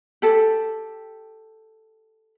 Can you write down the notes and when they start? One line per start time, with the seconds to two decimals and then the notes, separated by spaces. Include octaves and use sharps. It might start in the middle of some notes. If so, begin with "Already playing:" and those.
0.22 G4 A4